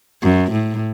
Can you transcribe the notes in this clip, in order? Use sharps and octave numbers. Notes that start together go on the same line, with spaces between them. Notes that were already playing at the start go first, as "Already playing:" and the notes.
F#2
A2